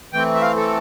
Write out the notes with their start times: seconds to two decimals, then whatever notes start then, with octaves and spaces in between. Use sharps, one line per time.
0.13 E3 A3 C4 G5
0.35 E5
0.42 F5
0.57 A4